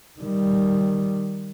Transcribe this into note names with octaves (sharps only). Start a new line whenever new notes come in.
D#3 G3